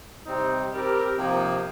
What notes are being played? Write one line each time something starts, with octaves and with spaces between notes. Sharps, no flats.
C3 G3 C4 D#4
G3 C4 G4 A#4
C3 F3 A#3 D#4